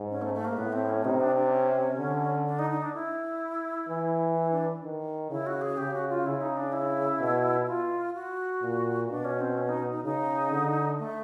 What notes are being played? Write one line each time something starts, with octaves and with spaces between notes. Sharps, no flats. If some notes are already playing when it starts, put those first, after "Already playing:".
Already playing: G#2
C#4
A3
A3
A#3
A2 B3
C4
C#4
C3 D#4
D4
D4
C#4
D3
D4
D#4
D#4
D4
E4
E3
E4
D4
D#3
C#3 E4
F#4
G#4
C#3 G4
F#4
F4
C#3 E4
D#4
D4
E4
B2
F4
F#4
A#2
B2 D4
C#4
C4
C#4
D#4
D#4
C#3 D#4
D3
A3